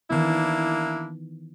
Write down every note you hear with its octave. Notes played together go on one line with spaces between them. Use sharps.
D#3 E3 A#3 B3 D4 E4